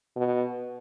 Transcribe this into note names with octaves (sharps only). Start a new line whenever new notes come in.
B2